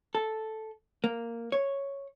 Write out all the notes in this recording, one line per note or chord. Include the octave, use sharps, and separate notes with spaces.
A4
A#3
C#5